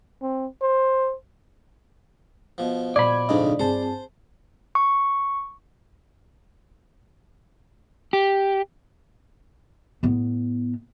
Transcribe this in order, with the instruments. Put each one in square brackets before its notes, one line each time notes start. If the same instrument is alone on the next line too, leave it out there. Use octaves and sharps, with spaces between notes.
[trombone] C4
C5
[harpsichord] B2 F3
[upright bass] A#2 G3 [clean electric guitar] D5 B5 [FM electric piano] G#6
[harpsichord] F2 G#2 C#3 [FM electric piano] D4 D#4 D#5
[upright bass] G2 F4 [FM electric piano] C4 G#4 A5 [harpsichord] C5
[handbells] C#6
[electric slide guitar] G4
[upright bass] A2 B3